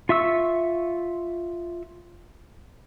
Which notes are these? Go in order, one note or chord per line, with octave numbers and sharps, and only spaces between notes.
F4 E5 C#6 E6